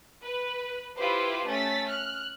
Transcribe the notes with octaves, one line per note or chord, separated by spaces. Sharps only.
B4
E4 F4 G4 B4 C5
A3 C#4 A6 B6
F6 F#6